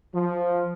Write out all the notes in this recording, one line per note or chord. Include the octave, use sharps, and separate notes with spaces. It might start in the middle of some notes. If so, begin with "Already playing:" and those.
F3